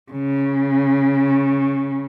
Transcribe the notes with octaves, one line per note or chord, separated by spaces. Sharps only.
C#3